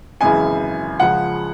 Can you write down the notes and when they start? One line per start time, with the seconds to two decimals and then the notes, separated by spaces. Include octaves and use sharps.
0.21 G#1 F#2 C#3 E3 G#5
1.00 C#2 C#3 F3 F#5